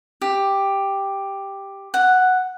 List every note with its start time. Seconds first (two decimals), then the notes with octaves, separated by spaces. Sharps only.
0.22 G4
1.94 F#5